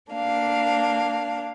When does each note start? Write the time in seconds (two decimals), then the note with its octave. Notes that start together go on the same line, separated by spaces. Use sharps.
0.11 A#3 D4 F5